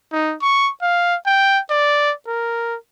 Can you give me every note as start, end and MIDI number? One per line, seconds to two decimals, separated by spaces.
0.12 0.34 63
0.42 0.70 85
0.82 1.16 77
1.26 1.59 79
1.70 2.12 74
2.27 2.76 70